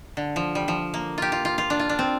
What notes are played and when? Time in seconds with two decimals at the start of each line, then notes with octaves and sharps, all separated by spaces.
0.17 D3
0.36 F3
0.55 G3
0.68 F3
0.94 A#3
1.18 F4 G4
1.32 F4
1.45 F4
1.58 F4
1.70 D4
1.79 F4
1.89 D4
1.99 C4